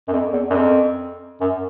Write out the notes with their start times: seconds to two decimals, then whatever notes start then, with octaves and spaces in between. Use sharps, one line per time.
0.08 F#2
0.12 F2
0.32 E2
0.50 F#2
0.54 F2
1.41 F#2